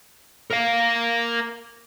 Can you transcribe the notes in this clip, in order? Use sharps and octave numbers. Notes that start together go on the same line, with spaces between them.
A#4 F5